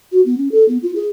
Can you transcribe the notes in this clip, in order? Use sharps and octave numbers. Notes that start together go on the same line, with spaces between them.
F#4
B3
C#4
A4
B3
F4
G#4